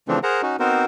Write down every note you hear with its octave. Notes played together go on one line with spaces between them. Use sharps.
C#3 E3 F3 A3 C4 D4
G#4 A#4 C5 F#5 A#5
C#4 D#4 F#4
B3 C4 D#4 F#4 A#4 C5